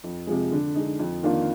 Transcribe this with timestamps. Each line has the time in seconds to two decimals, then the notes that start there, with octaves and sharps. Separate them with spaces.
0.03 F2
0.27 C3 F3 G#3
0.51 D3
0.75 G#3 D#4
0.99 F2
1.23 D#3 A#3 D4 F4